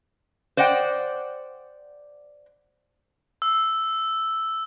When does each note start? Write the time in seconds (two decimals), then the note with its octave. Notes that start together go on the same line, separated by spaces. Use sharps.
0.57 C5 D5 D#5 F#5 G5
3.42 E6